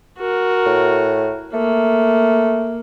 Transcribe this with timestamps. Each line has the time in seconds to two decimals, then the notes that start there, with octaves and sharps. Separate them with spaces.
0.18 F#4 A#4
0.66 A2
1.54 A3 A#3